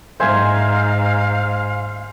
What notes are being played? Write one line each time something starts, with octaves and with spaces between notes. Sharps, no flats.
G#2 C5 E5 F5 G#5